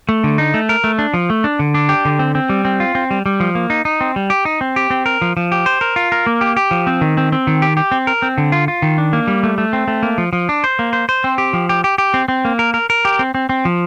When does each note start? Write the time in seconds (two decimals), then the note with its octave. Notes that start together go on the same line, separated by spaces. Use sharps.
0.09 A3
0.24 D3
0.38 D#4
0.54 A3
0.69 A#4
0.84 A3
0.99 D4
1.14 F3
1.30 A3
1.44 D4
1.59 D3
1.74 D4
1.89 G4
2.05 D3
2.19 C4
2.35 C4
2.49 G3
2.65 C4
2.80 F4
2.95 C4
3.11 G3
3.26 G3
3.40 F3
3.55 A#3
3.70 D#4
3.85 D#4
4.01 C4
4.16 G3
4.30 G4
4.45 D#4
4.61 C4
4.76 G4
4.90 C4
5.06 A#4
5.22 F3
5.37 F3
5.52 G4
5.66 C5
5.81 A#4
5.96 F4
6.12 A#4
6.27 A#3
6.41 G4
6.57 G4
6.71 F3
6.87 C4
7.01 D#3
7.17 C4
7.32 C4
7.47 D#3
7.62 G4
7.77 G4
7.92 C4
8.07 A#4
8.22 C4
8.38 D3
8.52 F4
8.68 F4
8.82 D#3
8.98 D4
9.13 A#3
9.27 G3
9.43 A3
9.58 A3
9.73 C4
9.88 A3
10.03 A#3
10.18 F3
10.33 F3
10.49 D4
10.64 C5
10.79 A#3
10.93 C5
11.09 C5
11.24 C4
11.38 G4
11.53 F3
11.69 G4
11.84 G4
11.98 G4
12.14 C4
12.28 C4
12.45 A#3
12.59 A#4
12.74 A#4
12.90 A#4
13.05 G4
13.19 C4
13.35 C4
13.49 C4
13.65 F3